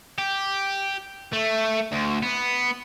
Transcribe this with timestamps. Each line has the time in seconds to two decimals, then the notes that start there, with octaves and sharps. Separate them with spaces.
0.18 G4
1.33 A3
1.92 D2
2.23 B3